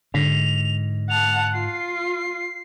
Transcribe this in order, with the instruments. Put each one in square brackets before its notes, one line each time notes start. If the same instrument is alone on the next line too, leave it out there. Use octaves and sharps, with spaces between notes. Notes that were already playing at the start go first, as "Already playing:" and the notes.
[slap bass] G#2 [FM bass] D3 [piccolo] F7
[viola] F#5 A5 [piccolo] F7
[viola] F4 [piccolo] C7